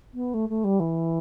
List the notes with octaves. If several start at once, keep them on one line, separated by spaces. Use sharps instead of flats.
B3
A3
A3
G3
E3